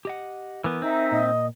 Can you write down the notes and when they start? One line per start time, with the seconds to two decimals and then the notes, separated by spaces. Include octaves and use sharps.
0.05 G4 D#5 F#5
0.64 E3 B3 A#4 G#5
0.82 C4 D#4 E5
1.12 A#2 D#5